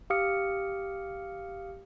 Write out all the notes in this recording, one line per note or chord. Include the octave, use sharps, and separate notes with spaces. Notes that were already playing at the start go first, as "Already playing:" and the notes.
G4 F5 D#6 F6 C#7